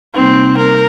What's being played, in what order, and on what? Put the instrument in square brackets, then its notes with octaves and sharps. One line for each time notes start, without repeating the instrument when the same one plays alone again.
[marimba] C3 G3 A#3 D#4 [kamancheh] C4
[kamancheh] A#4